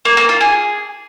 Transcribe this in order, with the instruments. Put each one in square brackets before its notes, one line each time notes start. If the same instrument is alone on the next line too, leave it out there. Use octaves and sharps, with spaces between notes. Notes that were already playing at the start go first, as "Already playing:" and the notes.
[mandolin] A#3
A#3
F4
G#4